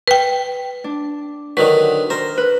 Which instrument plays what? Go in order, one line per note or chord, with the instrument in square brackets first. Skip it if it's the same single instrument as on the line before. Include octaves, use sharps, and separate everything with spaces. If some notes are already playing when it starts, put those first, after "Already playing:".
[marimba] B4 G5
[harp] D4
[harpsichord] D3 D#3 F#3 [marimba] B4
[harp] A#4 [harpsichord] C5
[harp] B4